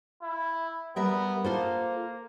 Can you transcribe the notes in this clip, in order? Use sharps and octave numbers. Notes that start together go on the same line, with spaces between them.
E4
G3 B3 A#4 E5
A#3 F4 A4 C5